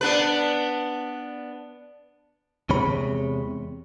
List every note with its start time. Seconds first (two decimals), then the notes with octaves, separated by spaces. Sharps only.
0.01 B3 D4 B4
2.70 E2 C3 G#3 C#5 B5